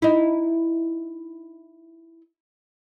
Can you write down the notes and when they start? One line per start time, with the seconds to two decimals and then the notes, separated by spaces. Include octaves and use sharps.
0.02 D#4 E4